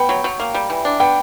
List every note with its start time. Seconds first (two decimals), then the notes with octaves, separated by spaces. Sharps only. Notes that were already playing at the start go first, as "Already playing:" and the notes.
Already playing: B3 G5
0.09 F#3
0.24 F#3
0.40 A#3
0.54 G3
0.70 E3
0.85 D4
1.00 B3 G5